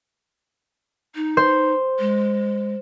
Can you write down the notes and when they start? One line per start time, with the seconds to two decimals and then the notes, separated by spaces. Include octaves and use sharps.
1.15 D#4
1.37 C5
1.99 G#3